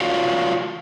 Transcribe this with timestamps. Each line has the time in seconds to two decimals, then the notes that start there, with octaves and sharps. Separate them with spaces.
0.01 F4 F#4 C#5 D5 F5